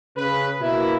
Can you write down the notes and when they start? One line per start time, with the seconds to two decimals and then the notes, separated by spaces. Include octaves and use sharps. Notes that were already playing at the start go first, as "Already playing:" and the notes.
0.17 C#3 B4
0.61 B2 A#3 E4